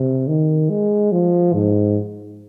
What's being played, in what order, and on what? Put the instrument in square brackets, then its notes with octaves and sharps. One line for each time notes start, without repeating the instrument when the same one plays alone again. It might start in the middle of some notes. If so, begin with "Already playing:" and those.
Already playing: [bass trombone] C3
D#3
G#3
F3
G#2